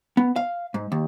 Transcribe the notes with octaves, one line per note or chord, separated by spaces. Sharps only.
B3
F5
G#2
D#2